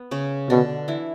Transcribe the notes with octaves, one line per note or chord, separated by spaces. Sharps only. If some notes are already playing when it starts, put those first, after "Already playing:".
Already playing: B3
C#3 C#4
B2 D3 D4
E3 E4